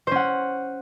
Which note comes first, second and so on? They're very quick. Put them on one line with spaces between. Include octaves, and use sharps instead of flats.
C5 C#4 F#5